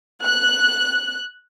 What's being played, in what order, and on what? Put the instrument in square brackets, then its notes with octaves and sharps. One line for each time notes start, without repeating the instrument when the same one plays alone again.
[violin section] F#6